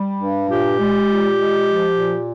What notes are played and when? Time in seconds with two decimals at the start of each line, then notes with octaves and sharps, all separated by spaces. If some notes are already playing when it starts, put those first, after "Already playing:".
Already playing: G3
0.20 G2
0.49 A#2 G4
0.78 G#3
1.07 A#2
1.37 G#3
1.66 F3
1.95 A#2